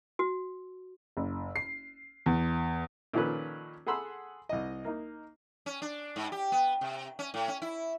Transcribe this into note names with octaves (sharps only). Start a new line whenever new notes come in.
F#4
F#1
C7
E2
A#2 D#3 F3 C#4 A4 B4
G#4 A4 F#5 B5 C6 E6
C2 D#5
A#3 D#4
C#4
D4
G#2
G4
B3
C3
C#4
A2
C#4
E4